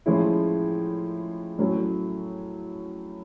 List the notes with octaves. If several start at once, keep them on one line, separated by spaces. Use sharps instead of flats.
A2 F3 G#3 C#4 E4
A2 F#3 A3 C#4